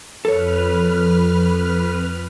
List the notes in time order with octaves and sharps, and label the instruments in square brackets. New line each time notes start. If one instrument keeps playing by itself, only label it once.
[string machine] F2 B4 F6 [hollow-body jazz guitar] A4 C#5